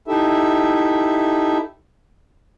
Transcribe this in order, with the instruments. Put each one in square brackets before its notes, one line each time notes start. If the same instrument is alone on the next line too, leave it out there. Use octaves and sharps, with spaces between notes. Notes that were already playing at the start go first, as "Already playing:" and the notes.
[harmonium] D#4 E4 G4 A4 E5